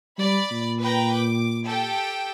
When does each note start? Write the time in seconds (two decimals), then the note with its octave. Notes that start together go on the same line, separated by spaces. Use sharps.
0.18 G3 D5 B5
0.51 A#2
0.81 B4 G5 A#5
1.14 D6
1.66 G4 A4 G5